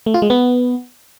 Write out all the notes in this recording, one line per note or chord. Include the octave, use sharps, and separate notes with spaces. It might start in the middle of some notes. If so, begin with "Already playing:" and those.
A3
F4
G#3
B3